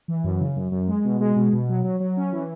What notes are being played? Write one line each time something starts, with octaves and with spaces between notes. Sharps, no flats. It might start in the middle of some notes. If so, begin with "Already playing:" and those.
E3
F#2
C#3
F#2
F#2
G#3
B2
G#3
B2
B2
F#3
F#3
F#3
C#4
E3